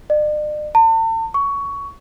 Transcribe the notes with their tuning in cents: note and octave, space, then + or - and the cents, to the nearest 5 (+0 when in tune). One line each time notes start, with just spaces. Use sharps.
D5 +45
A5 +40
C#6 +15